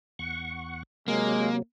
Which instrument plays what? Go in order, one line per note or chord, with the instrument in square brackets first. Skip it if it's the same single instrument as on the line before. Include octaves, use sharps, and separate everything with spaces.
[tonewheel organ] E2 F#5 C#6
[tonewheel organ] C3 F#3 [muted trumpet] G#3 [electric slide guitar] A#3